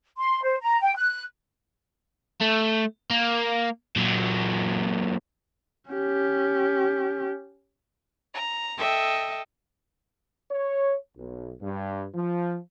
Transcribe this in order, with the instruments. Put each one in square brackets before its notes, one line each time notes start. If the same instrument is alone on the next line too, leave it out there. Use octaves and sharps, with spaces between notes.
[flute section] C6
C5
A#5
G5
F#6
[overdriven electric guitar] A3
A#3
A#2 F#3
[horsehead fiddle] C#4 G4
[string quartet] A#5
A4 D#5 E5 G5
[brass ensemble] C#5
B1
G2
F3